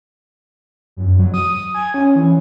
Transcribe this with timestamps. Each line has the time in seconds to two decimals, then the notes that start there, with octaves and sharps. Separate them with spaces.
0.97 F#2
1.19 F#3
1.34 D#6
1.75 G#5
1.94 C#4
2.16 E3